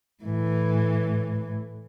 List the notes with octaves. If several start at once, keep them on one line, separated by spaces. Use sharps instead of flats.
A2 E3